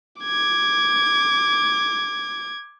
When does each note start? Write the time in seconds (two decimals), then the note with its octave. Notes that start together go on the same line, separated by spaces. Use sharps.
0.22 D6 G#6